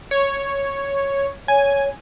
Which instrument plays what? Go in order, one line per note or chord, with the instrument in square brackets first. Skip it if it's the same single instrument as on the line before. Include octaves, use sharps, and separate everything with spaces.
[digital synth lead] C#5
[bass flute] C#5 [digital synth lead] G#5